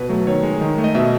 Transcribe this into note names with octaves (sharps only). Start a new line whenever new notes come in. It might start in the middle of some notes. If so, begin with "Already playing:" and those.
Already playing: B2 B4
F#3 A3
D#3 C#5
G#3
D#3
A3
D#5
B2 E5